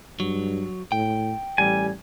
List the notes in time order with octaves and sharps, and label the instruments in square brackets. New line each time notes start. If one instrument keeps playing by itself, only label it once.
[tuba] G2 [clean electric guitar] F#3
[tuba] A2 [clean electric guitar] G5
[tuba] A1 [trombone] G3 [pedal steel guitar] G#5